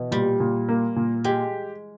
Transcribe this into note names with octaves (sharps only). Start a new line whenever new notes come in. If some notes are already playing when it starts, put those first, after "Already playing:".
Already playing: B2 E3
A#2 G3
A#2
A#3
A#2
G#3 G4